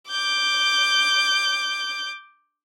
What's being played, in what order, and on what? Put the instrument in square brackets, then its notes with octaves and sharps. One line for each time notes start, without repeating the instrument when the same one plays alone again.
[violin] D6 G6